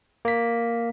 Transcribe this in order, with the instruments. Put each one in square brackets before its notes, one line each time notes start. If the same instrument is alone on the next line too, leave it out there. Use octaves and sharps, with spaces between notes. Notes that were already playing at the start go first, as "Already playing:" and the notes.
[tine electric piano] A#3 B6